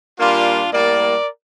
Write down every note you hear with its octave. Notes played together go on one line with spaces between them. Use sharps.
A#2 G3 A#3 D4 F4
A2 G3 A#3 A#4 D5